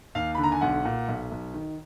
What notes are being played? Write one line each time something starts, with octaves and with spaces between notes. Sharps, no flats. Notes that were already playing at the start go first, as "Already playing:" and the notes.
D#2 F5
D3 B5
A#5
G#5
B1 F#5
A#2
B1
B1
D#3